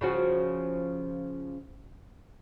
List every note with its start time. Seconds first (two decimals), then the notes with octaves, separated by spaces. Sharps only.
0.01 C#3 F3 F#4